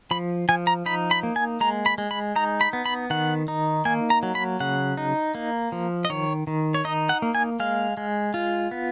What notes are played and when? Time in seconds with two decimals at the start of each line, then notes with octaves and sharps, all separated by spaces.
0.11 F3 B5
0.49 F3 G#5
0.67 A#5
0.86 D#4 B5
1.11 B5
1.23 A#3
1.36 G#5
1.61 G#3 A#5
1.86 B5
1.98 G#3
2.11 B5
2.36 D#4 A#5
2.61 B5
2.73 B3
2.86 B5
3.10 D#3 F#5
3.48 D#4
3.85 A#3 G#5
4.10 A#5
4.23 F#3
4.35 B5
4.60 C#3 F#5
4.97 D#4
5.35 A#3
5.72 F3
6.05 D#5
6.10 D#3 C#5
6.47 D#3
6.74 C#5
6.85 D#4 D#5
7.09 F#5
7.22 A#3
7.35 G#5
7.60 G#3 F5
7.97 G#3
8.34 F4
8.71 B3